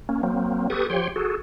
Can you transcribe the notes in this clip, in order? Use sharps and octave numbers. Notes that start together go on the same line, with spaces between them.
A#3 C#4
F#3 A#3 C4
G4 A4 B4 C#6 D#6
F3 G4 C#5 G5 C6
F#4 G#4 A4